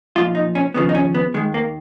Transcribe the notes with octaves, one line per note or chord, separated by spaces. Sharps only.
B1 A#2 F3 F4
D#4
C#4
D#2 C#3 F3 B3
D#4
C#4
B3
D#2 D#3 G#3
A#3